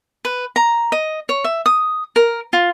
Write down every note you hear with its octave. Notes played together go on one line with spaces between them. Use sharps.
B4
A#5
D#5
C#5
E5
D#6
A#4
F4